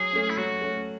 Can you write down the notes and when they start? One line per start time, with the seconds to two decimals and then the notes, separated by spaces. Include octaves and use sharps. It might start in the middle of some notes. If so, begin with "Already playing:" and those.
Already playing: F#3 G#4
0.13 A3 C#4
0.30 E4
0.37 F#3 F#4
0.61 A3 C#4